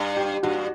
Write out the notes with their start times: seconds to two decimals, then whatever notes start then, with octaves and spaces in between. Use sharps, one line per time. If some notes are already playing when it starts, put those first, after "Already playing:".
Already playing: G2
0.17 G4
0.43 G2 F#4